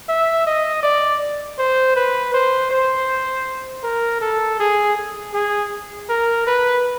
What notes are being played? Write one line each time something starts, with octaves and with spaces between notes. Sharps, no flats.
E5
D#5
D5
C5
B4
C5
C5
A#4
A4
G#4
G#4
A#4
B4